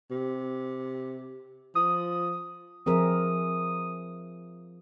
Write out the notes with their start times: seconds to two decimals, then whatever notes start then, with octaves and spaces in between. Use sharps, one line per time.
0.11 C3
1.75 F3 D#6
2.86 F3 C4 G#4 A#4 E5 D#6 F6